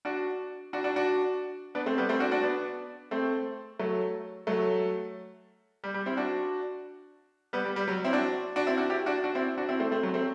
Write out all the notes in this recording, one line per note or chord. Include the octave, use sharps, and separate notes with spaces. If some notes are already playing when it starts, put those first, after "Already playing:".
D4 F#4
D4 F#4
D4 F#4
D4 F#4
B3 D4
A3 C4
G3 B3
A3 C4
D4 F#4
D4 F#4
B3 D4
A3 C4
F#3 A3
F#3 A3
G3
G3
C4 E4
D4 F#4
G3 B3
G3
G3
F#3
C4 E4
D4 F#4
D4 F#4
C4 E4
D4 F#4
E4 G4
D4 F#4
D4 F#4
C4 E4
D4 F#4
C4 E4
A3 C4
A3 C4
F#3
A3 C4